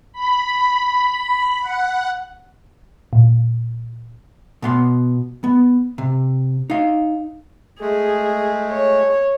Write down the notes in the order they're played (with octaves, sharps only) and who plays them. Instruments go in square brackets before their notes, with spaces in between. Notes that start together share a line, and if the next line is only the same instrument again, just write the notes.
[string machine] B5
F#5
[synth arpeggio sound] A#2
[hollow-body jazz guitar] B2 B3 C6
B3
C3
D#4 F5
[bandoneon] G#3 A3 [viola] G#4
[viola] C#5